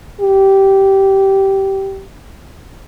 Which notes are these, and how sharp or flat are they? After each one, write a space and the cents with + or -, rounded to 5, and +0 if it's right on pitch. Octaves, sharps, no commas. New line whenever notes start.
G4 -15